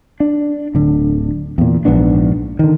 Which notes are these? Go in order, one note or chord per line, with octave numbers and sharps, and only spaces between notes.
D4
D1 D3
E2 A#2
A#1 G#2 B3 D4
D3 D#3